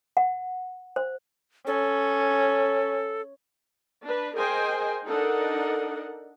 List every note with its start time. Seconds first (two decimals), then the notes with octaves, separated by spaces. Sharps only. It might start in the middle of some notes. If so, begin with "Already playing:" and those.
0.17 F#5
0.96 C5
1.67 C#4 A4
4.04 D4 B4
4.35 G#4 A#4 C5 D#5 G5 G#5
5.06 D4 D#4 A4 A#4 D#5 F#5